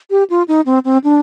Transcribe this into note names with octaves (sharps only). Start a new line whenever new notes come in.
G4
F4
D#4
C4
C4
D4